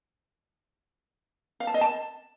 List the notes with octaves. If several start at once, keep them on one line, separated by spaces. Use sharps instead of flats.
F5
A5
D#5
A5